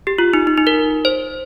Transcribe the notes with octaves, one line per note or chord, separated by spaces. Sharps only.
G4
F4
D#4
D#4
D#4
A#4
C5